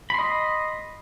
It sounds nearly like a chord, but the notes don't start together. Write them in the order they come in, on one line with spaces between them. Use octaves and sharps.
B5 C6 D#5